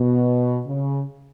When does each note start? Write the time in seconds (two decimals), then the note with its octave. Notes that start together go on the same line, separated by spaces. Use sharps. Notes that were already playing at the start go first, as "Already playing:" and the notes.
Already playing: B2
0.67 C#3